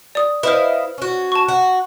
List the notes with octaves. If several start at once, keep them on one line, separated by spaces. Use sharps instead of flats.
D5 D#6
E4 B4 C5 D#5 F5
C#4 F#4
A5 C#6
F#4